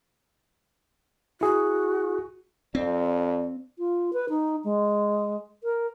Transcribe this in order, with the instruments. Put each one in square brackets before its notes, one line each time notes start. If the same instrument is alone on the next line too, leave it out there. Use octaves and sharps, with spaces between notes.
[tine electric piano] E4 G#4 [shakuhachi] F#4
[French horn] F2 [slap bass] C4 [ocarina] D5
[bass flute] F4
B4
D#4
G#3
A#4